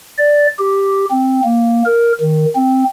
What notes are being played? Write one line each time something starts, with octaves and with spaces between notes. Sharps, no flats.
D5
G4
C4
A#3
A#4
D#3
C4